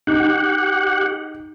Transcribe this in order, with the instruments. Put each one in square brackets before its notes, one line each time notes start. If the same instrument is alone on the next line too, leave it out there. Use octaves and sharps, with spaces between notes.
[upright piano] D#4 [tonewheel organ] G4 F#5